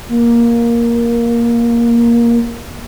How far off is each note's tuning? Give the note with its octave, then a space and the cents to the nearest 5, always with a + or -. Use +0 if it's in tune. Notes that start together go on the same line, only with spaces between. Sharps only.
A#3 +10